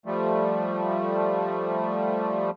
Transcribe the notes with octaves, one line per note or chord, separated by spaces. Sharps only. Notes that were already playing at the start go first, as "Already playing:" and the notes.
F3 G3 A3